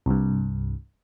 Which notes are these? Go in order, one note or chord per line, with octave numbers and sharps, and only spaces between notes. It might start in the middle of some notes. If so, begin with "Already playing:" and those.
C2 G2